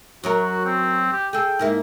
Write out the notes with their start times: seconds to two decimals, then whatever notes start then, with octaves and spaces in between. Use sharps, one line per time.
0.24 F#2 F#3 F#4 A#4
0.65 C4
1.12 G4
1.33 G#4 A4 G5
1.59 G#2 A#3 E4